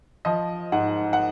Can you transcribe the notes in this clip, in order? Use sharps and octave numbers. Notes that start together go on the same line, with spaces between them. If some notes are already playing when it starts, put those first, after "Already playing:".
F3 D#5
G#2 F#5
F#5